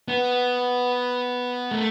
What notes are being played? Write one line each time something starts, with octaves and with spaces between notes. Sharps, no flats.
B3
A3